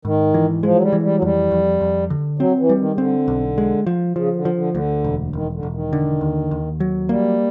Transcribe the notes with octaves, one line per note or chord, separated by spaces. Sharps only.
G#2 D#3
E3
F3 G#3
F#3
G3
E3
G3
F#3
F2 G3
F2
F2
D3
F#3 C4
E3
G3
D#3
C#3
D3 C4
B1
G#3
F3
C#3 F3
D3
F3
D3
D2 D3
E1
E1 D#3
D3
E1
D#3
D3
D#2
D#2
F#3
G3 A#3